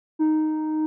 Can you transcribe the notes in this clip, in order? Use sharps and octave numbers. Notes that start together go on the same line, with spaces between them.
D#4